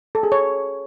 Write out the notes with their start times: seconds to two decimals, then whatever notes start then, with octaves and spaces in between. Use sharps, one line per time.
0.15 A4
0.23 G#4
0.32 C#5